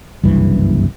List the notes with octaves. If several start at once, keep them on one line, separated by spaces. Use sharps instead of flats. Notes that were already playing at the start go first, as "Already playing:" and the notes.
F#1 C2 G2 E3